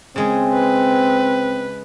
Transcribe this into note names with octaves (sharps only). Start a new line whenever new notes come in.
C#3 G#3 C4 G#4
B4